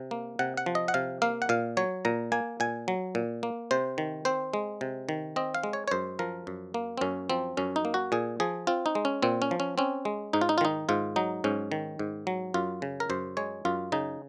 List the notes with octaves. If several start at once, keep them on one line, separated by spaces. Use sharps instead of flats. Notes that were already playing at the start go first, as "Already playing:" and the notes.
Already playing: C3
A#3
C3 F#5
F#5
F3
D#5
F#5
C3 F5
A#3 F5
F#5
A#2 F5
F#3 C#5
A#2 A#5
A#3 G#5
A#2 G#5
F#3
A#2
A#3
C3 C5
D#3
C4 C5
G#3
C3
D#3
C4 D#5
F5
G#3
C#5
C#5
F#2 C5
F3 A#4
F#2
A#3
C4
F#2 C#4
F3 C4
F#2 C#4
D#4
A#3
F#4
A#2 G#4
F3 G#4
C4 F4
D#4
G#3
C#4
A#2 C4
C#4
F3
C#4
C4 C#4
G#3
G#2 D#4
F4
D#4
F4
D#3 D#4
G#2 F4
F#3 D#4
G#2 C#4
D#3
G#2
F#3
F#2 F4
C#3
A#4
F#2 C5
G#3 C#5
F#2 F4
C#3 D#4